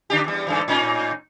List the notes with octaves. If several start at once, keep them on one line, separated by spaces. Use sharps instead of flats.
D3 D4 G4
E2 G3
G2 D3 E3
A2 C#4 D#4